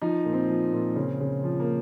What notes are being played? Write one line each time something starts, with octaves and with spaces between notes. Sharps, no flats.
F3 D#4
A#2
C4
F3
A#2
C#3
C#3
F3
A#3